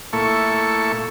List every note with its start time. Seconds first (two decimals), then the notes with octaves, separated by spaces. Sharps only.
0.13 A#2 A3 E4 A4 C#6